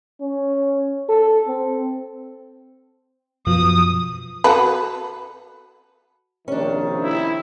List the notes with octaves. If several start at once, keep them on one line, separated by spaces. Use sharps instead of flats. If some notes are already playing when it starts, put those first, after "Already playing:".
C#4
A4
C4
F#2 B2 F3 D#6
F#4 A4 B4
A#1 C3 D#3 C#4 D4
E4